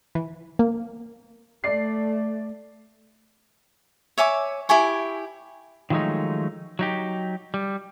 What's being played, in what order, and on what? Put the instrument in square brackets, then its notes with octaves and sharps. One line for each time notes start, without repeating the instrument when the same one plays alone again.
[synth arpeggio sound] E3
A#3
[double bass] A3 [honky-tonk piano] D5 C7
[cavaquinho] C#5 E5 G#5 D6
E4 G4 G#5 C#6
[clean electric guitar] D#3 F3 F#3 G#3 A3 D#4
F#3 D#4 G4
G3